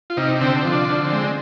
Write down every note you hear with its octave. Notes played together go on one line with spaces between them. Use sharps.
F4
C3 D#4
D3 C4
F3
D4
D3
C4
G#3